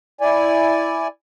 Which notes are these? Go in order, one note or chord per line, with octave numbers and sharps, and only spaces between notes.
E4 D5 G#5